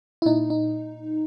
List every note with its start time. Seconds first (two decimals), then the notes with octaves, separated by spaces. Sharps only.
0.22 E4
0.26 A#2 D#4
0.50 D#4